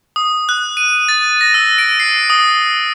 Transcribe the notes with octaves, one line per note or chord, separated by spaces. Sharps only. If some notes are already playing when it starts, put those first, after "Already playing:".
D#6
F#6
D#7
A6
A#6
E6
D7
C7
D#6